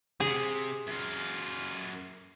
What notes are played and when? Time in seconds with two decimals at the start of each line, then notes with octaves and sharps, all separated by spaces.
0.20 C3 G#4
0.87 F#2 F4